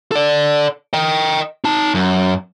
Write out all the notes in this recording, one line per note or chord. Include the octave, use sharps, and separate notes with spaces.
A4 D5
D#5 G5
D#4 A5
F#2